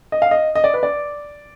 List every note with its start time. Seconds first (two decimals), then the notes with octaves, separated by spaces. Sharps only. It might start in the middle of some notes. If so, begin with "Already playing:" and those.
0.12 D#5
0.22 F5
0.31 D#5
0.55 D#5
0.64 D5
0.74 B4
0.83 D5